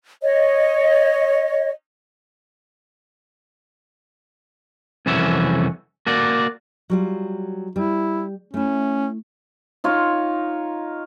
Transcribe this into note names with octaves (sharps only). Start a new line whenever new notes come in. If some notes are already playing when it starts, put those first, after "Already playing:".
C#5 D#5
C2 F2 E3 C#4 F#4 E5
A#3 F#4 D5
F#3 G3 F4
G3 E4
A3 C#4 E4
D#4 F4 C#5